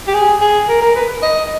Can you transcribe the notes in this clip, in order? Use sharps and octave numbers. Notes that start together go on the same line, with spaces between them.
G4
G#4
G#4
A#4
A#4
B4
D#5